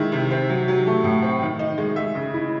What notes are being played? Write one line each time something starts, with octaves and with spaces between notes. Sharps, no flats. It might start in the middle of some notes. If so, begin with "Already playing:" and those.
Already playing: D#3 G#3 E4 E5
C3
C4
F#3
F#3
A3
A2
C4
D#3
D#4
G#3
G#3 E5
C#3
E4